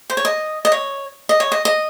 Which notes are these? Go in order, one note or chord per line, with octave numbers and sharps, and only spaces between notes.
C5
C#5
D#5
D#5
C#5
D#5
C#5
D#5
D#5